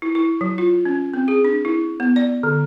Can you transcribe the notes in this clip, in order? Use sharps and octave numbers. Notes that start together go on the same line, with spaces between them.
E4
E4
F#3
F4
C#4
C4
G#4
D4
E4
B3
D5
D3